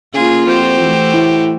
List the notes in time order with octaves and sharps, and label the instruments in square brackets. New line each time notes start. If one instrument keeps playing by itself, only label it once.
[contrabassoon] C#3 [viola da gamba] A#3 F4 [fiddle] G#4
[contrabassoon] F2 [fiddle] F#4 G4 [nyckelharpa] C5
[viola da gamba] E3 A3
[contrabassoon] A2